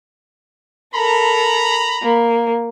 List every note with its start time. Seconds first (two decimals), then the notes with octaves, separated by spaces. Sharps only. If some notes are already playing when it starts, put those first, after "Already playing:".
0.94 A4 A#4 A#5 B5
2.02 A#3